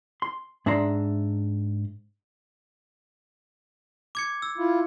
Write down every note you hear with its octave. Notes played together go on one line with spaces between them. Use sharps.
C6
G#2 D4 E5 A#5 C6
D6 G#6 C#7
E6
E4 F4